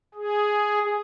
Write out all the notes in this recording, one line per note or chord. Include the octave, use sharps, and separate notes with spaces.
G#4